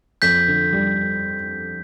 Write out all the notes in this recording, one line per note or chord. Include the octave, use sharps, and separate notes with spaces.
F2 G6 B6
D3
G3